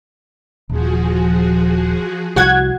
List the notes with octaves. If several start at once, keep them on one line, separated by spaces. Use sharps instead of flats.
D#1 F3 F#4 G#4
C2 F#4 F#5 G#6